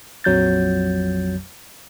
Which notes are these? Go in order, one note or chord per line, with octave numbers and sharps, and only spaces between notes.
A#1 F2 F#3 G6 A6